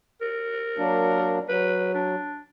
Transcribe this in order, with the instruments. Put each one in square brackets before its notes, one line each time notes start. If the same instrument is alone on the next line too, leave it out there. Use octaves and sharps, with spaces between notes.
[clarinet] A#4
[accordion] F#3 A#3 D4
[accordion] F#3 [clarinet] B4
[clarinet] D4